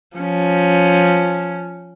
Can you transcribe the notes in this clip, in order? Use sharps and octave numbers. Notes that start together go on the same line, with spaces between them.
F3 C#4